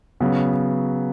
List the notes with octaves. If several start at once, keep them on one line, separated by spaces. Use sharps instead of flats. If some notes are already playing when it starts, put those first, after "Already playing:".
C#3 F#3 B3